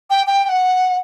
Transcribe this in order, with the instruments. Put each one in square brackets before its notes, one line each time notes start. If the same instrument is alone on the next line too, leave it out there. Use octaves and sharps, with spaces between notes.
[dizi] G5
G5
G5
F#5